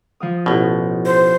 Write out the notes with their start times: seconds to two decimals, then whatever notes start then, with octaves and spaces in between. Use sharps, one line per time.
0.20 F3 F5 D#6
0.46 A1 B2
1.06 C5